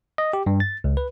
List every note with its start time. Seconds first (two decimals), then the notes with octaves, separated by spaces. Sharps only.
0.18 D#5
0.33 G4
0.46 G2
0.60 A6
0.84 C#2
0.97 B4